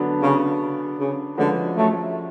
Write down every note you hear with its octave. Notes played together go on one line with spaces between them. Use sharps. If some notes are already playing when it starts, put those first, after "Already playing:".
Already playing: D3 F#3 B3 D4
C#3
C#3
D3 F3 G#3 C#4 F#4 B4
F#3 A3